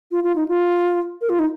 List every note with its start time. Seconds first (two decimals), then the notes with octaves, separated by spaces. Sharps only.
0.11 F4
0.24 F4
0.36 D#4
0.48 F4
1.21 A#4
1.29 F4
1.39 D#4